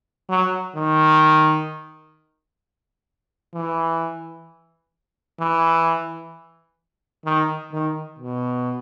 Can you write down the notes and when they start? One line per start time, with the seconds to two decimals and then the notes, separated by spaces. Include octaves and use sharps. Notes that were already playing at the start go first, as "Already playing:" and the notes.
0.29 F#3
0.76 D#3
3.54 E3
5.40 E3
7.25 D#3
7.72 D#3
8.18 B2